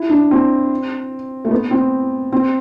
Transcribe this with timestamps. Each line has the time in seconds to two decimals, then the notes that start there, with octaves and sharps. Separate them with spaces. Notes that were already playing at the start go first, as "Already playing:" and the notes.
Already playing: E4
0.10 D4
0.31 C4
1.45 A3
1.51 B3
1.71 C4
2.32 C4